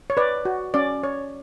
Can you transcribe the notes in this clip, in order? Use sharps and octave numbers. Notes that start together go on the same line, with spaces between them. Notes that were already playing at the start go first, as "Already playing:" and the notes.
C#5
B4 D5
F#4
C#4 D5
C#5